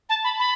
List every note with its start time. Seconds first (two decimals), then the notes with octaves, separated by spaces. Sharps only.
0.09 A5
0.24 B5
0.39 B5